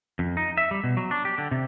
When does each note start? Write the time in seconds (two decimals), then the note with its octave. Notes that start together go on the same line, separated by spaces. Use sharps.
0.19 F2
0.37 D#4
0.57 E5
0.71 G3
0.84 B2
0.97 F#3
1.11 D4
1.25 G4
1.38 D3
1.51 C3